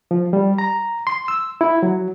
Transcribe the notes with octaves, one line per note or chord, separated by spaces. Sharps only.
F3
G3
A#5
C6
E6
E4
F#3